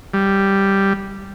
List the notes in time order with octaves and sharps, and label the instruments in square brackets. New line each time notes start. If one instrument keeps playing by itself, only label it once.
[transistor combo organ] G3